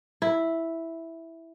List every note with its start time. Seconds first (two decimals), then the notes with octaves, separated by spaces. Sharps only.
0.22 E4